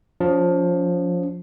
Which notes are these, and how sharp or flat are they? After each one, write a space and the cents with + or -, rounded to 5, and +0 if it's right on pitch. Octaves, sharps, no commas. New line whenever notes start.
F3 +20 C#4 +45